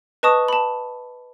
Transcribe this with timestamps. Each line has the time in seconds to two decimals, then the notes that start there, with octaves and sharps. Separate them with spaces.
0.23 B4 D#5 A5 C#6 D#6
0.48 A5 B5